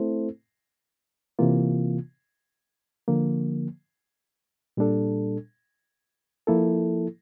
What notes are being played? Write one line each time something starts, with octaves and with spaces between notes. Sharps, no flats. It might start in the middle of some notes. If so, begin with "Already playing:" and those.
Already playing: A3 C4 E4 A4 C5
C3 E3 A#3 F4
D3 F3 A#3
A#2 G3 D4 A4
F3 A#3 E4 A4